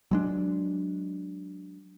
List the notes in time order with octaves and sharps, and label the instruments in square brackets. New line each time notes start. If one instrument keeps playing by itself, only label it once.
[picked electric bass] F#3 G#3 D4